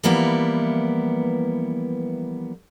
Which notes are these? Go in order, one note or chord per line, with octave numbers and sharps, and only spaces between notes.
E3 F3 G3 A#3 B3 E4